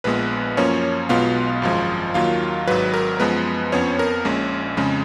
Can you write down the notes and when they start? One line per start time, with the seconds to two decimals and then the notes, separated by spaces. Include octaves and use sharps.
0.04 A#1 A#2 G#3 B3 B4
0.57 F#2 F3 A#3 C#4 C#5
1.09 B1 B2 G#3 B3 F4 F5
1.62 G#1 F#2 F3 G#3
2.14 D#2 D#3 F#3 A#3 F4 F5
2.67 G#1 G#2 F#3 B4
2.94 A#4
3.20 F#2 F3 G#3 B3 B4
3.72 F2 F3 B3 C#4 C#5
3.99 A#4
4.25 A#1 A#2 G#3 C#4
4.77 F2 C#3 G#3 C#4